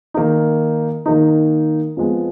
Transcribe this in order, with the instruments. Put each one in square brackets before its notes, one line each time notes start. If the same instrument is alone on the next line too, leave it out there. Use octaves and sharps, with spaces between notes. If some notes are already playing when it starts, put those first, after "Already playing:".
[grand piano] D#3 A#3 D#4
D#3 A#3 D#4
F2 F3 G#3 B3